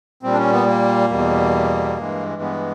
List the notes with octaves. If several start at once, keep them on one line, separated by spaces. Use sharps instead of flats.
A#2 G3 C4
D4
C#4
B3
A#3
E2 B2 G3
G2 E3 G#3
B3